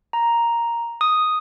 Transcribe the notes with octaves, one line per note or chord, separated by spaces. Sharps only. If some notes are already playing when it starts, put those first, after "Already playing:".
A#5
D#6